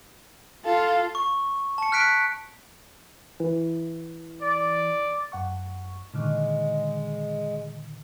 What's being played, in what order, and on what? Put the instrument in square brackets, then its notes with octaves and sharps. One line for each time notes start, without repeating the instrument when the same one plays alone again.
[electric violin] F4 A4 [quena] F5
[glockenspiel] C#6
A5 C#7
F6 F#6 B6 D7
[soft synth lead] E3
[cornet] D5
[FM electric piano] F#2 F#5 C#6
[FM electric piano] A#2 D3 D#3 [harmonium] G#3